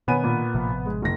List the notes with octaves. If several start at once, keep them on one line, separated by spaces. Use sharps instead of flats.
B2 D#3 B3 C#5 G#5 D#7
A#2
A1 C3 F3
G#3
F#1 A#6